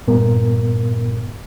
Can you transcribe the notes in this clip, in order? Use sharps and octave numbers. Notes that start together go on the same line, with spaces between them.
G2 A#2 B3 A#4